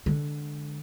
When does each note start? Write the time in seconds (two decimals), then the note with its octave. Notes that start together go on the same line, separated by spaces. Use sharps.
0.06 D3 G#3